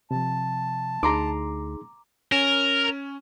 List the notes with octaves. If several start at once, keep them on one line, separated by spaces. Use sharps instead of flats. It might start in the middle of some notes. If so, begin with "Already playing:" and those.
C3 F3 A5
D2 D#4 G#4 A#5 C6 D6
C#4 A#4 G#5 E7